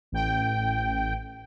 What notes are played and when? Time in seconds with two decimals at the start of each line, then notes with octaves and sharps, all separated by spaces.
0.12 A1 G5